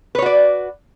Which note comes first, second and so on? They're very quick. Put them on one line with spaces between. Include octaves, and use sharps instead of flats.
B4 C#5 F#4 D5